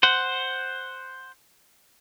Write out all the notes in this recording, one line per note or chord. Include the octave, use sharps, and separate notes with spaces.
C5 F#5